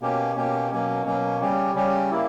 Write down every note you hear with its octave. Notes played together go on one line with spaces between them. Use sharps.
B2 A#3 C#4 G4
B2 A#3 C#4 G4
B2 F#3 A#3 C#4
B2 F#3 A#3 C#4
C#3 G3 C#4 G4
C#3 G3 C#4 G4
A#3 E4